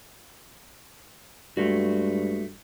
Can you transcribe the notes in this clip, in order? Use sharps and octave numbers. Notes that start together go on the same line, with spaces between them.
G2 G#3 A3 F#4